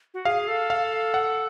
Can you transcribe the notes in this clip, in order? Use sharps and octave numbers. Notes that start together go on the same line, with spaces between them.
F#4
G#4 F5
A4
F5
F#5